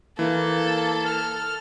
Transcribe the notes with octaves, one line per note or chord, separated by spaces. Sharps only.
E3 A#3 A4
F6